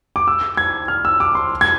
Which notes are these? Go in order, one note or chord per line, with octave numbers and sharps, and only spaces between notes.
D6
E6
G#6
F6
E6
D6
C6
G#6